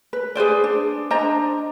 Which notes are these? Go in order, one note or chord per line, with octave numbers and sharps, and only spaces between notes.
B4
G#4 B4 C5 D5
D4
D4 C5 D#5 A#5